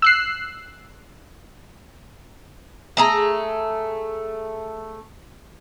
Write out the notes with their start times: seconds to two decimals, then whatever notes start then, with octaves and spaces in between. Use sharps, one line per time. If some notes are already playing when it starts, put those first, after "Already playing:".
0.02 E6 F#6 C7
2.97 A3 G#4 A#5